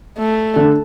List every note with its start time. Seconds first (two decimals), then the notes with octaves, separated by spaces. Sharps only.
0.18 A3
0.56 D3